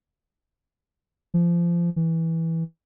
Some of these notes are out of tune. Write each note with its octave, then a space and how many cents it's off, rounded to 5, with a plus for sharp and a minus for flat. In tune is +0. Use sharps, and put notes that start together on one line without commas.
F3 -25
E3 -10